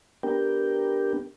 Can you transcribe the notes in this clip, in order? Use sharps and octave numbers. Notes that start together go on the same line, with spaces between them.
B3 D4 G4 A#4 G5